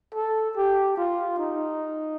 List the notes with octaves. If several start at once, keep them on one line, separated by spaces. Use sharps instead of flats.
A4
G4
F4
D#4